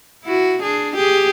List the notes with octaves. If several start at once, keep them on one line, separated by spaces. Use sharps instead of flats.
E4 F#4
D4 G#4
G4 G#4